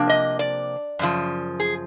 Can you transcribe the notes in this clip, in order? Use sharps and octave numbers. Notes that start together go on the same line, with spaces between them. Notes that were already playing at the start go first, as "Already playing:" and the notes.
Already playing: C3 F3 A#3 D4
D#5
D5
F#2 C#3 F3
G#4